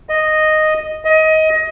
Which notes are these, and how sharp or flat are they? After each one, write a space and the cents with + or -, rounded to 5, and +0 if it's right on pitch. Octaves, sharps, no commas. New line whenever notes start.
D#5 -5
D#5 +20